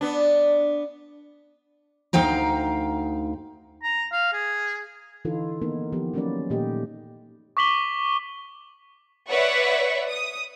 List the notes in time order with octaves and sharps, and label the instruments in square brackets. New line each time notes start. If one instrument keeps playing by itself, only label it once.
[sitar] B3 D4
[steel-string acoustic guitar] D2 D#4 F5 G5 A#5
[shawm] A#5
F5
G#4
[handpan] D3 E3 D#4 F4 A4 B4
D#3 A#3 B3 D#4 A#4
D#3 F3 B3 G4
F#3 A#3 C#4 F4 B4 D5
A#2 D#3 A3 G4 D#5
[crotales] C#6 D6 B6 F#7 G7
[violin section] B4 C#5 D5 E5 F#5 C#6
D#6